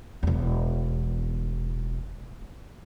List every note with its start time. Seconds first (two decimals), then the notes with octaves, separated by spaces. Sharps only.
0.23 E1 E2